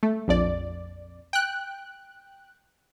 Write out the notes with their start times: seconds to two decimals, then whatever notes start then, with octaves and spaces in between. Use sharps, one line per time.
0.03 A3
0.28 A#1 F2 D5
1.33 G5 F#6